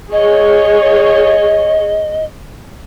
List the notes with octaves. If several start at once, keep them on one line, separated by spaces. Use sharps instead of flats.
G#4 C#5 D#5